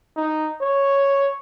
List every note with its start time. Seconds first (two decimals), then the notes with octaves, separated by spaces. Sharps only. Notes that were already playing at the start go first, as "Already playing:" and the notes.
0.17 D#4
0.61 C#5